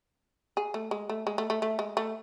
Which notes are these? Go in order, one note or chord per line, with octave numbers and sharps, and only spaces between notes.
G#4
A3
G#3
A3
G#3
A3
A3
A3
G#3
A3